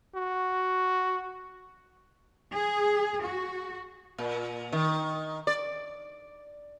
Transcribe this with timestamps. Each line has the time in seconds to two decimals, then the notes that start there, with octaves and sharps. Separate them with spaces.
0.15 F#4
2.53 G#4
3.23 F#4
4.18 A#2
4.73 D#3
5.47 D5